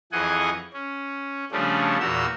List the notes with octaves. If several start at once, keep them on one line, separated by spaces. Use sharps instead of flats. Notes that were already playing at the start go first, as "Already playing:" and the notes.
F2 E3 G#4 D#5 F#5 G#5
C#4
C#3 F3 G3 A3 C#4 D4
E2 A#2 F#4 A#4 E6 G6